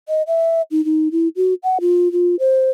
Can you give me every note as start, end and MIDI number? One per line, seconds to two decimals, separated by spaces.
0.09 0.23 75
0.27 0.62 76
0.71 0.84 63
0.85 1.08 63
1.12 1.28 64
1.36 1.54 66
1.63 1.78 78
1.81 2.12 65
2.12 2.36 65
2.39 2.71 72